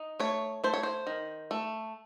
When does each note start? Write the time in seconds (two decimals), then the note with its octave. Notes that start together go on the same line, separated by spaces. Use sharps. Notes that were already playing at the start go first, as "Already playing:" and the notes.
Already playing: D#4
0.20 A3 C#5
0.64 A3 C5
0.74 C#5
0.83 C5
1.07 D#3
1.51 A3